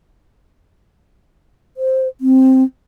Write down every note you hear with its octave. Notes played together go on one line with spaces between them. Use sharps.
C5
C4